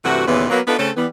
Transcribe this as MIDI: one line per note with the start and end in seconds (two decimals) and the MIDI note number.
0.04 0.26 43
0.04 0.26 48
0.04 0.26 52
0.04 0.26 57
0.04 0.26 66
0.26 0.46 39
0.26 0.46 46
0.26 0.46 49
0.26 0.46 52
0.26 0.46 59
0.50 0.60 54
0.50 0.60 58
0.50 0.60 59
0.67 0.75 59
0.67 0.75 62
0.67 0.75 63
0.67 0.75 65
0.67 0.75 69
0.67 0.75 71
0.79 0.90 49
0.79 0.90 57
0.79 0.90 60
0.79 0.90 61
0.79 0.90 69
0.96 1.06 52
0.96 1.06 55
0.96 1.06 59